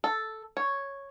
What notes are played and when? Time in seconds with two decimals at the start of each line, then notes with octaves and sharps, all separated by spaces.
0.04 A4
0.57 C#5